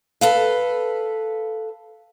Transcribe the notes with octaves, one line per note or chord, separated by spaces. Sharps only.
A4 B4 F5